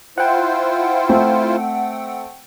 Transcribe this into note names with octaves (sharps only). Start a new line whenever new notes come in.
E4 F4 C5 F#5 G5
A3 C4